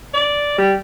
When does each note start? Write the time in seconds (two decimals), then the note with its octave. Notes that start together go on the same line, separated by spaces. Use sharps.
0.14 D5
0.58 G3